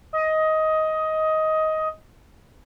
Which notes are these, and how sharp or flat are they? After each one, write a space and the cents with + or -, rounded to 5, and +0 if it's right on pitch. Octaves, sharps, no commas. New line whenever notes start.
D#5 +15